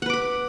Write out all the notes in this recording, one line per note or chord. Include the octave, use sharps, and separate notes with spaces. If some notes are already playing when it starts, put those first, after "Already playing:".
B4 F#5 B5 D6